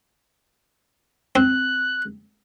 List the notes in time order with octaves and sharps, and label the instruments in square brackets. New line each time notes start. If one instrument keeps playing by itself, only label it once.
[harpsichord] C4 [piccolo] F#6